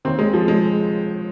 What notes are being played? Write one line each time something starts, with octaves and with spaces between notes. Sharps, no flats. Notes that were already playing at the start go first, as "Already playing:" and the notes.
D#2 D#3 C4
G#3
F3
G#3